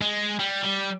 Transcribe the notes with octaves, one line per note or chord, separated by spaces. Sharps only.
G#3
G3
G3